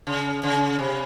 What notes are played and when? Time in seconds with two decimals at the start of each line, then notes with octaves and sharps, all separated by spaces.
0.07 C#3
0.43 C#3
0.79 C3